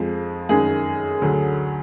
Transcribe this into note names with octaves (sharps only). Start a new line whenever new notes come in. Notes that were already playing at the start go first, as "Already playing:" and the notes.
Already playing: F2 F3 G#3
F#2 D#3 G#3 G#4
D2 D3 F#3